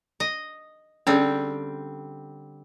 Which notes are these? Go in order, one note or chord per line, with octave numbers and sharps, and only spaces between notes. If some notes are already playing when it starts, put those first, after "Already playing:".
D#5
D3 G3 C4 C#4 G#4